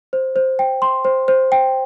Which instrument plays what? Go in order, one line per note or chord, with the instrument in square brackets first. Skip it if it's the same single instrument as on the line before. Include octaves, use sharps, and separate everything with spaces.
[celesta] C5
C5
G5
C6
C5
C5
G5